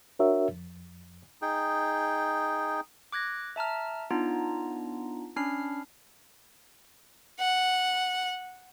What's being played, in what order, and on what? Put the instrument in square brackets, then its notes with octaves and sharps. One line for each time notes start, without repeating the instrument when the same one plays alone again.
[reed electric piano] D4 F#4 A#4 C#5 E5
F2
[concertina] D#4 G#4 G5
[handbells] D6 F#6 G#6 A#6
E5 A5 A#5 F6
B3 D4 D#4 F4 A#5
C#4 D4 B5 F6 C7
[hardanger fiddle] F#5